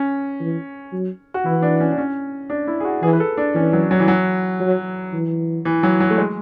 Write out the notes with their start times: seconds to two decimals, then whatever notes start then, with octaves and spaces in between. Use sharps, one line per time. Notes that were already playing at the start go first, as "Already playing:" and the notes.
Already playing: C#4
0.40 E3
0.93 F#3
1.34 F#4
1.45 E3 E4
1.62 D4
1.80 C#4
1.92 D4
1.98 C#4
2.50 D4
2.67 E4
2.80 G#4
2.85 F#4
3.03 E3 G#4
3.13 B4
3.20 A4
3.37 D4
3.55 E3 C#4
3.73 F#3
3.91 F#3
4.00 E3
4.08 F#3
4.60 F#3
5.13 E3
5.65 E3
5.83 F#3
6.00 F#3
6.10 A3
6.18 G#3